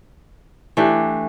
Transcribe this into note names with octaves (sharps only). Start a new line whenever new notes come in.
E3 A3 D4 G4